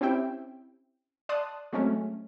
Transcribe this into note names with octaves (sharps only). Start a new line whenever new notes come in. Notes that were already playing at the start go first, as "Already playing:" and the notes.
C4 C#4 E4 G4 E5 G5
D5 A5 C6 D#6 F#6
F#3 G#3 A3 C4 C#4